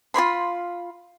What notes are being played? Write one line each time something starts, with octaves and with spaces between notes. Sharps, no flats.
F4 C#5 B5 C6